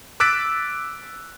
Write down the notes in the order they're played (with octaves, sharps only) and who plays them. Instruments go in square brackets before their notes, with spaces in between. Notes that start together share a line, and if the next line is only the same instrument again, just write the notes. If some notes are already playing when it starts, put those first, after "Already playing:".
[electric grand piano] D6 E6 F#6 A6 B6 D7